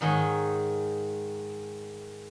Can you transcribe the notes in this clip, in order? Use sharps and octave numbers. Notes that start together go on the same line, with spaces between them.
G#2 D#3 G#3 C#5